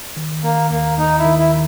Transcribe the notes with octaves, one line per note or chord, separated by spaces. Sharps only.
D#3
D#3 A#3
D#2 A#3
D#2 D#4
E4
D#3
E4